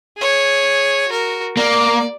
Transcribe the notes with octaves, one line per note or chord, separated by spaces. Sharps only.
G#4 C#5
F#4 A#4
A#3 D5